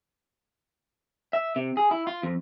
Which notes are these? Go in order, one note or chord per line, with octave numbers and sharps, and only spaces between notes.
E5
C3
G#4
E4
F4
F2